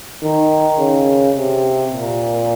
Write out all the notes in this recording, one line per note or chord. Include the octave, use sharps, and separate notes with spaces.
D#3
C#3
C3
A#2